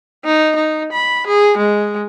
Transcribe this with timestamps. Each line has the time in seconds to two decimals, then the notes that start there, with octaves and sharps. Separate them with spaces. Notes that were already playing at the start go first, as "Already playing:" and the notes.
0.25 D#4
0.56 D#4
0.92 B5
1.27 G#4
1.57 G#3